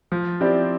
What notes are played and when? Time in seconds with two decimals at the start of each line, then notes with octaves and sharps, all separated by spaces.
0.12 F3
0.41 C4 E4 G4 D5